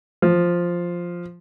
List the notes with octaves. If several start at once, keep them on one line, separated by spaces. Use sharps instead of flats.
F3